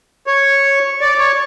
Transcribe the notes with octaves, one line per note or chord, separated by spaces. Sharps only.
C#5
D5
C#5